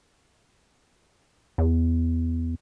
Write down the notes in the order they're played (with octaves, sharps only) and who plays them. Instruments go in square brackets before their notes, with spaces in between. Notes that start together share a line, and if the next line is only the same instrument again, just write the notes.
[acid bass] E2